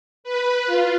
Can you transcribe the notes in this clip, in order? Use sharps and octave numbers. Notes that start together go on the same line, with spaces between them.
B4
F4